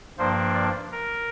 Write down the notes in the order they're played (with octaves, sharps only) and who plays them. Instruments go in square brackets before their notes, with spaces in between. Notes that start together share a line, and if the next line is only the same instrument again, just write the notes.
[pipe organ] G2 F3 A#3 D4 C5
D5
A#4